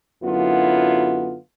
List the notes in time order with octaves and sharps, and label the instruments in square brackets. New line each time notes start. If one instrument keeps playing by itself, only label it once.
[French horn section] F#2 D3 F#3 B3 E4 F4